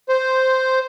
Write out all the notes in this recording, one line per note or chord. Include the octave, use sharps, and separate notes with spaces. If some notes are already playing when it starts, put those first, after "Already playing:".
C5